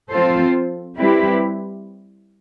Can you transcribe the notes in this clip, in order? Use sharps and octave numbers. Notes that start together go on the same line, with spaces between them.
F3 C4 F4 A4 C5
G3 C4 E4 G4 B4